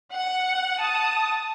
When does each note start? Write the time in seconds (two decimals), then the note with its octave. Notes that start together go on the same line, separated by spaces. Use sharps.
0.13 F#5
0.80 A5 D#6